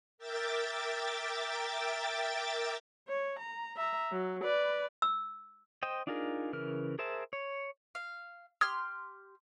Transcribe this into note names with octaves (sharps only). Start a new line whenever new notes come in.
A#4 E5 G5 D6 A6
C#5
A#5
E5 A#5
F#3
B4 D5
E6
C5 D#5 G5
D4 D#4 F4 G#4 A#4
C#3 E3 A#4 F6
G#4 A#4 C5 E5 A5
C#5
F5
G4 C6 D#6 F6 G#6